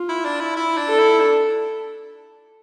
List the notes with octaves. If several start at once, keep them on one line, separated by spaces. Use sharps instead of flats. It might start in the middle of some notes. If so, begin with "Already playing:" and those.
Already playing: F4
E4
D4
E4
E4
D4
A4
E4
D4